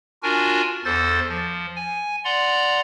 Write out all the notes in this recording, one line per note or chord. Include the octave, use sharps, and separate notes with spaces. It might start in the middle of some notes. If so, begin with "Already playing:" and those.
D4 F4 F#4 A#4 G#5
E2 A4 C5 A6
F3
G#5
D5 F#5 A#5 C6